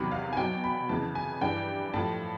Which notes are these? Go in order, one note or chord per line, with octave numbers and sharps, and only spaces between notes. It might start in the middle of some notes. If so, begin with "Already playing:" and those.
Already playing: E2 C3 D#3 F#3 B5
F5
G#5
B2 F#3 G5
B5
F2 C#3 E3 A5
G#5
G2 E3 G3 G5
A2 F3 A5